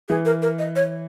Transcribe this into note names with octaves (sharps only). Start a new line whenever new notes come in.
E3 G#4
A#4
A#4
D#5
C#5